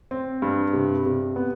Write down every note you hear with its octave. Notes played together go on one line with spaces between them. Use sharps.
C4
G2
C3
C3
B3